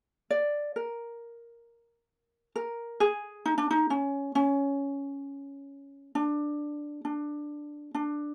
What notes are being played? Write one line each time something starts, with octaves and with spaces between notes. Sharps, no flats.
D5
A#4
A#4
G#4
D#4
D4
D#4
C#4
C#4
D4
D4
D4